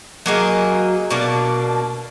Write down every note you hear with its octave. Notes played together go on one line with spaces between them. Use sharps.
F#3 A#3 D#4 G#4
B2 A#3 D4